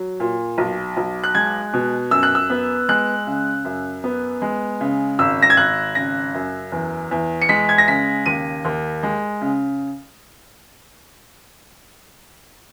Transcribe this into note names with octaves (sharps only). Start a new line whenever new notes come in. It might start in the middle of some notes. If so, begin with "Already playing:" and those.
Already playing: F#3
A#2
B1
B1
F#6
G#3 G#6
B2
F#2 E6
F#6
E6
B3
G#3 F#6
C#3
F#2
B3
G#3
C#3
G#1 E6
A#6
G#6
G#1 F#6
C#3 A#6
F#2
E2
E2
C#7
G#3 B6
G#6
A#6
C#3 B6
D#2 D#7
D#2
G#3
C#3